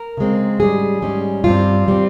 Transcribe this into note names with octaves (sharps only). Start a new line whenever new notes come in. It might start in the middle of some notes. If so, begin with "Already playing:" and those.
Already playing: A#4
C#3 G#3 C4
G#2 G3 C#4 G#4
G#2 G3 C#4
G2 G3 C4 F4
G3 C4